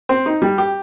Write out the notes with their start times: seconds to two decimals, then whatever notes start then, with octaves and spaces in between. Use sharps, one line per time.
0.09 C4
0.26 D#4
0.42 G3
0.58 G4